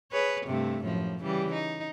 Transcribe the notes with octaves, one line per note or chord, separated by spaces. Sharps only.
G#4 B4 C#5
G2 C3 A3
F#2 A2 F3
C#3 E3 G3
D#4